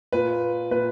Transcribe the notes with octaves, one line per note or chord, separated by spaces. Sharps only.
A#2 B4
A#2 B4